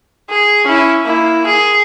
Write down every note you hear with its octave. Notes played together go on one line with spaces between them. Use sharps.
G#4
C#4 E4
A#3 E4
G#4